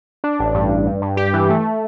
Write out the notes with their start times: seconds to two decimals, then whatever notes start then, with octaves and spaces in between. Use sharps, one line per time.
0.24 D4
0.39 A1
0.55 G2
0.70 G2
0.87 G2
1.02 G2
1.17 G4
1.33 E3
1.50 A3